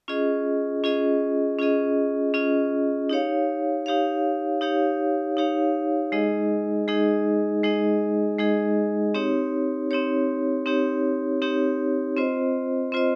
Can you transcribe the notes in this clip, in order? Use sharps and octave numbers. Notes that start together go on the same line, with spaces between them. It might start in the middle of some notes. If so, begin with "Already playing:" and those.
C#4 F4 G#4 D#5
C#4 F4 G#4 D#5
C#4 F4 G#4 D#5
C#4 F4 G#4 D#5
D#4 G4 C#5 F5
D#4 G4 C#5 F5
D#4 G4 C#5 F5
D#4 G4 C#5 F5
G#3 D#4 G#4 D#5
G#3 D#4 G#4 D#5
G#3 D#4 G#4 D#5
G#3 D#4 G#4 D#5
C4 D#4 G4 C#5
C4 D#4 G4 C#5
C4 D#4 G4 C#5
C4 D#4 G4 C#5
C4 F4 C5 D#5
C4 F4 C5 D#5